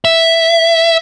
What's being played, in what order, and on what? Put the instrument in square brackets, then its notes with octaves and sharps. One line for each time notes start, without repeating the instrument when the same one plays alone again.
[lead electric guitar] E5